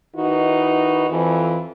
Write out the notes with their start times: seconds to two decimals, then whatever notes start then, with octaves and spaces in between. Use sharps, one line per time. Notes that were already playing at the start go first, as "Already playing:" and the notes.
0.16 D#3 D#4 E4 F#4 B4
1.10 F2 E3